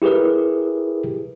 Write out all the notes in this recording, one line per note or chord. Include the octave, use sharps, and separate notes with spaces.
E4 G4 G#4 A#4 B4